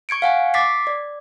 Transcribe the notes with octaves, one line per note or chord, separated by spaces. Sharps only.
C#6 G#6 C#7 D7
F5 F#5 G#5 C#6
D6 A6 B6 C7
D5